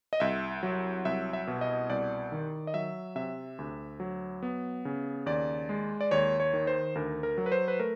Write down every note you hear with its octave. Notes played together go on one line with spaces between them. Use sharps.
D#5
C2 E5
F#3
C2 E5
E5
B2
D#5
C2 D5
D#3
D#5
F#3 E5
C3 E5
D2
F#3
B3
C#3
D#2 D5
G#3
D5
D#2 C#5
C#5
D#3
C5
D2 A#4
A#4
F#3
B4
C5
B4
A3 A#4